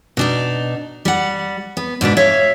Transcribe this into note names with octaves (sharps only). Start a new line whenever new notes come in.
B2 D4 D#4
G3 F#5
B3
G#2 B2 D4 B4
C#5 E5 F5